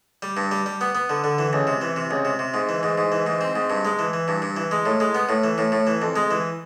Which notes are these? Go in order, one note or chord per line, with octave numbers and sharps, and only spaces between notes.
G3
G2
G3
G3
B3
B3
D3
D3
E3
C#2
C3
E3
C3
C#2
C3
C3
G#2
E3
G#2
G#2
E3
G#2
C4
G#2
G2
G#3
E3
E3
G2
G2
E3
G#3
A2
G#3
B3
A2
E3
A2
A2
E3
F2
G#3
E3